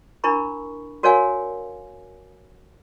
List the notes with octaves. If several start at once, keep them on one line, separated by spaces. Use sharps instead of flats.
D4 E4 A#4 B5 C#6
F#4 A#4 C#5 D5 F5 G#5